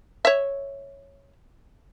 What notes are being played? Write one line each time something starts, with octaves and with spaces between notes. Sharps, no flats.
C#5 E5